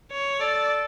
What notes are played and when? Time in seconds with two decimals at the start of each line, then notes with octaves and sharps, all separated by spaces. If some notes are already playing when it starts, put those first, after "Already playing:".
0.12 C#5
0.41 A4 D5